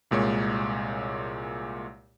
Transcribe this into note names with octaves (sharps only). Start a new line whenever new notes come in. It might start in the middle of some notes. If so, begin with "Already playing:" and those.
C2 A#2 G#3 C#5